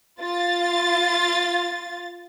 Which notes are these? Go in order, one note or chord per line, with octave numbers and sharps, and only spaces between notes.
F4 A6